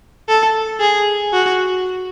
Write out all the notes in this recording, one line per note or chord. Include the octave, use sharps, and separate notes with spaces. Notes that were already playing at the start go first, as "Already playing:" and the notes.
A4
G#4
F#4